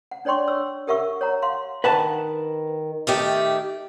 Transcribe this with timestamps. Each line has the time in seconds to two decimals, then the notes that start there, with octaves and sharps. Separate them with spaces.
0.11 F#5
0.25 D4 C#5 D5 G5 C6 C#6
0.47 C#5 E6
0.87 G4 A#4 E5 F#5 C#6 E6
1.21 C#5 F#5 A#5
1.42 F5 F#5 C6
1.84 D#3 B4 F#5 A5
3.07 D#3 A3 G4